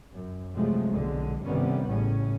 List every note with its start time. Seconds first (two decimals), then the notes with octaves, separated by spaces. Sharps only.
0.13 F#2
0.54 C3 F3 F#3 G#3 A3
0.92 B1 A#2 D3 G#3
1.44 G1 C3 D#3 G3 B3 C#4
1.88 A1 A2 C#3 C#4